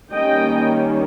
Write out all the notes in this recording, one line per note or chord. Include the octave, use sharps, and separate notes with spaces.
D#3 G3 A#3 C#4 D#5 G5